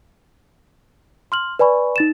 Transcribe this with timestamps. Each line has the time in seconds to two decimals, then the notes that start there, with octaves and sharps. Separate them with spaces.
1.32 C6 F6 F#7
1.59 B4 D5 G#5 B5 C#6
1.96 D#4 A6 E7